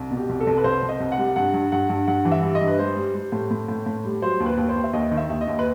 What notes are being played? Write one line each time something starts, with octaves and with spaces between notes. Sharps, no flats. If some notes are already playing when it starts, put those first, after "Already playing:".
Already playing: C2
B2
G4
C2
A4
C2
B4
C2 C5
C2
D#5
C2
F#5
G3
G2 F#5
G2
G2 F#5
G2
G2 F#5
E3
E5
G3
D#5
G2
B4
G3 C5
G3
G3
A2
A2
A2
A2
G3
F#3 C5
D#2
B4
D#2
C5
D#2
E5
D#2 D#5
D#3
E5
D#2 E5
D#5
D#2
B4